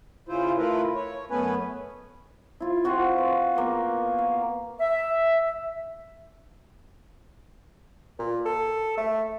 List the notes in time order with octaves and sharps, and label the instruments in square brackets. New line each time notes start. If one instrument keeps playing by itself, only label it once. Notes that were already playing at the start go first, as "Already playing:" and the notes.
[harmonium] C#3 E4 F4 C5
A3 E4 F4 A#4 B4
C#5
F#2 A3 B3 C#4 B4 G#5
[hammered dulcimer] E4 F4
C4 F4 F#4 C5
B4
A#3 B3
F5
[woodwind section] E5
[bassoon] A#2
A4
A3